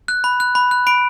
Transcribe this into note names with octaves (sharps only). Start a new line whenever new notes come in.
F#6
B5
F#6
B5
F#6
B5 D7